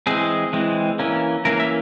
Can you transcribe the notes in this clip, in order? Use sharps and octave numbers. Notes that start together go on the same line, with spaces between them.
E3 G#3 C4 G#4
E3 G#3 C4
E3 A#3 C#4
E3 A#3 C#4 A#4
E5